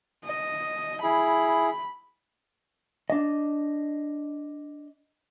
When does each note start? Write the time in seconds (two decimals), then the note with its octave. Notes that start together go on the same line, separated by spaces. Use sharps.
0.25 D#5
1.03 E4 G#4 B5
3.10 D4 D#5